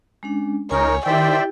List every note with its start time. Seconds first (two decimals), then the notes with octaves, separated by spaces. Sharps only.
0.23 G#3 C#4 D4
0.71 C#2 D#4 A#4 C#5 G#5 C#6
1.06 D#3 E4 G4 C5 D5 E5 G5